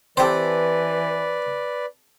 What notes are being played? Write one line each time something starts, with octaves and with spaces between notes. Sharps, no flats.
E3 C4 G4 A4 B4 C5 D5